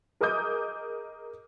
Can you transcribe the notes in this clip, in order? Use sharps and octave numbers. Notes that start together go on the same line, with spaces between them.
G#4 A#4 D#5 D6 D#6 G6